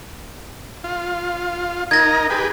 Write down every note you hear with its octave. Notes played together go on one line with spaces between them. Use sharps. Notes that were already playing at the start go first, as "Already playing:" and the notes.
F4
D#4 A#4 G#6 A#6
G4 G#4 B4